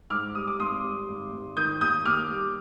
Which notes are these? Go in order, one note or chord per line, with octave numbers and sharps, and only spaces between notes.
G#2 D6 F6
G3 D#6
D6
G#1 C6 D#6
G3
G#1
G#1
D#3 D#6 G6
D#2 D#6 G6
D#2 D6 F6
G3